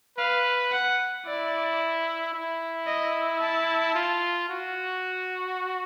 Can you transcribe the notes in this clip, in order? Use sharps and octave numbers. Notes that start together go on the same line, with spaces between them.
B4 F5
F#5
E4 D5
E4
D#5
A5
F4
F#4